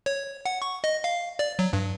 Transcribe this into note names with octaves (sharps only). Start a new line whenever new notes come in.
C#5
F#5
C#6
D#5
F5
D5
F#3
G2